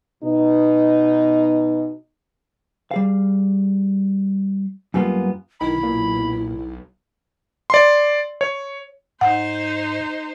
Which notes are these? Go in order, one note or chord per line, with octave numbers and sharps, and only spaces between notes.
B2 D#4
G3 G#4 F5
F#2 G3 A#3 B3 F4
B1 D#3 E4 B5
A#2
D5 C6
C#5
G#2 D#4 C5 F#5